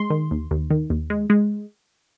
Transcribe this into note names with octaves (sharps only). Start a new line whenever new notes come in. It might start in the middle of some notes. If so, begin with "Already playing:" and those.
Already playing: G#3 C6
D#3
D#2
D#2
D#3
D#2
G#3
G#3